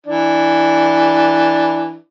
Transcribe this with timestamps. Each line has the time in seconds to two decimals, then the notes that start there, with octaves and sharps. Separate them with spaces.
0.06 E3 D4